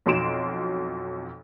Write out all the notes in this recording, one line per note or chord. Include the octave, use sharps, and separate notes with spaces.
B1 F2 F#4 C6 D7 E7